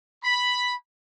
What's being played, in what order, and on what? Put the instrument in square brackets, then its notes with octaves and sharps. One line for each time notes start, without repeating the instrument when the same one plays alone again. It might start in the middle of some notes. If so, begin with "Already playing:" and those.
[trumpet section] B5